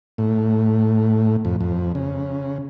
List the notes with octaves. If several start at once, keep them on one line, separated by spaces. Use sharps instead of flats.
A2
F2
F2
C#3